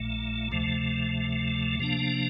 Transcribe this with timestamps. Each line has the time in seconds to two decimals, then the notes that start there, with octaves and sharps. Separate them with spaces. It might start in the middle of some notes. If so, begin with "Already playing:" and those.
Already playing: A#1 A#2 A3
0.51 D2 C3 F3 A3
1.79 C3 F3 A#3 D4